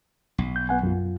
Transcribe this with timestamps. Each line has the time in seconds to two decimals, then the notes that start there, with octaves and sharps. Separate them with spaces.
0.38 B1
0.56 G6
0.69 B3 F#5 G#5
0.83 F#2 F4